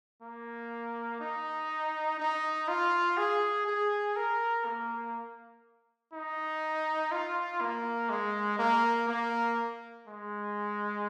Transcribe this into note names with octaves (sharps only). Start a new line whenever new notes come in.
A#3
D#4
D#4
F4
G#4
G#4
A#4
A#3
D#4
F4
A#3
G#3
A#3
A#3
G#3